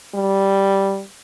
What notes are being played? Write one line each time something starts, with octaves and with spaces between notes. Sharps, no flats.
G3